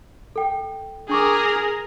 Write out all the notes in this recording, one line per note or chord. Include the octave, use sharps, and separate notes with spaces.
A4 G5
D4 G#4 A#4 C#6 D6
A#6